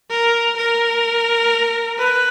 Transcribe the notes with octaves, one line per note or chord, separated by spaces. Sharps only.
A#4
A#4
B4